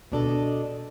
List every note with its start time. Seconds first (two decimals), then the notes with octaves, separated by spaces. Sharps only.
0.12 B2 D4 A4 D#5